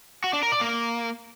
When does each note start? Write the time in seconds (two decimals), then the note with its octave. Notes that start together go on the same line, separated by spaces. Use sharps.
0.24 F#4
0.33 D4
0.43 A#4
0.52 D5
0.61 A#3